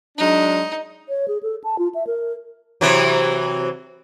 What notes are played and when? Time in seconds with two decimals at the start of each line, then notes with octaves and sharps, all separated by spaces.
0.18 F#3 G#3 D4 D#4
1.09 C#5
1.28 G#4
1.43 A4
1.64 A5
1.79 F4
1.95 E5
2.07 A#4
2.81 C3 E3 F#3